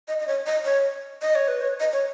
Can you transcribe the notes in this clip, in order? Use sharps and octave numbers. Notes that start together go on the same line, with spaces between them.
D#5
D#5
C#5
D#5
C#5
D#5
C#5
B4
C#5
D#5
C#5